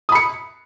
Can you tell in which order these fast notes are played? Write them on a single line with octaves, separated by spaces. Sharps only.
D#6 B5 C#7